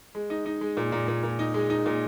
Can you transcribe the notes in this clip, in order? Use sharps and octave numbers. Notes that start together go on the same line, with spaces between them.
G#3
D#4
D#4
G#3
A#2
A#2
A#2
A#2
D#4
G#3
D#4
A#2